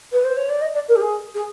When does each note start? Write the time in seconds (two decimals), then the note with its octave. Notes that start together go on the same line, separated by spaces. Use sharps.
0.13 B4
0.25 C5
0.37 C#5
0.49 D5
0.61 D#5
0.74 D5
0.88 A#4
0.96 G4
1.01 G#4
1.35 G#4